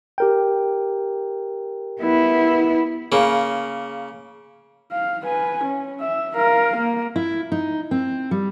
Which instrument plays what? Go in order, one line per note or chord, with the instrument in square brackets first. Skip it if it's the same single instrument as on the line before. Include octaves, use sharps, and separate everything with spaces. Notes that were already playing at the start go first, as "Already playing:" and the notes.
[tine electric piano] G4 A#4 G5
[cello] B3 E4
[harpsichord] C#3 A#3
[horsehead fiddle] F5
B4 G#5
C#4
E5
A#4 F5
A#3
[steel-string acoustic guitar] E4
D#4
C4
G3